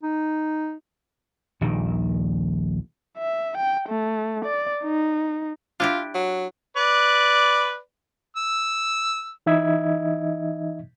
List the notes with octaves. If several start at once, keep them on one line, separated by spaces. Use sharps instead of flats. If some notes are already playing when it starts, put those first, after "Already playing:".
D#4
D#1 A#1 A#2 D#3
E5
G5
A3
D5
D#4
D4 E4 F4 G4
F#3
B4 D5
E6
E3 D#4 D#5 E5 G#6